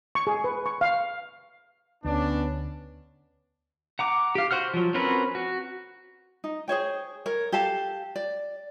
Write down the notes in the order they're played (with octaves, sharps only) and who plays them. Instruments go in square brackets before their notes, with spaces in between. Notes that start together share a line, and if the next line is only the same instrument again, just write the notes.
[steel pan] C#6
G#4
B4
C#6
F5
[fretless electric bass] D2 [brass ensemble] B3 C#4 D4
[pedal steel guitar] F#5 A#5 D6
G4 F5
F#4 C5 F#5 F6
F3 F#3
C4 C#4 F#4 A#4 B4
F#4
[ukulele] D#4
G#4 C5 C#5 G5
A#4 C#5
G4 A4 F5 A5
D5